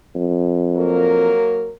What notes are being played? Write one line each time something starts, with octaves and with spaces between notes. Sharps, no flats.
F2
F#3 A#3 A#4